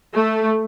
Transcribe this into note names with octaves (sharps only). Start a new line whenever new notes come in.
A3